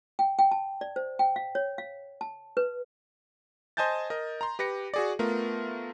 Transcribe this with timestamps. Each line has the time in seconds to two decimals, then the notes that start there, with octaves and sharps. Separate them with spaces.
0.19 G5
0.39 G5
0.51 A5
0.81 D5
0.96 C5
1.19 G5
1.36 F5
1.55 C#5
1.78 F5
2.21 A5
2.57 B4
3.77 C5 D#5 G#5 A5 G6 A6
4.10 A#4 D#5
4.41 A#5 C6
4.59 G4 B4 A#6 C#7
4.94 F#4 G#4 D5
5.19 A3 B3 F4 A#4